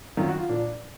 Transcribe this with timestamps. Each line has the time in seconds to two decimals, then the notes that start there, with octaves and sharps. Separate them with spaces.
0.17 F#2 D#3 F#3 F4
0.28 F#4
0.38 F4
0.49 A#2 F3 D4